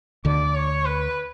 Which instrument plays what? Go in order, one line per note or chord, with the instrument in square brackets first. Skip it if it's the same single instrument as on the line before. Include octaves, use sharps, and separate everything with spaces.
[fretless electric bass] D2 D3 [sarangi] D5
[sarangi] C#5
B4